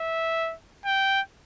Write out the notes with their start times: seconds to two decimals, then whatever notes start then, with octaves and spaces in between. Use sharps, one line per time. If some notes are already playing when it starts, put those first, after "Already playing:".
Already playing: E5
0.85 G5